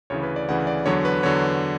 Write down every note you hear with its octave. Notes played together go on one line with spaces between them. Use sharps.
D2 C#3 E3 C#5
B4
D5
D2 C#3 E3 F#5
D5
E2 D3 F#3 C#5
B4
E2 D3 F#3 C#5